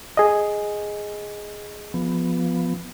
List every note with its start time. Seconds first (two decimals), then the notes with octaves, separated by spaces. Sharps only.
0.17 G#4 D#5
1.94 F3 B3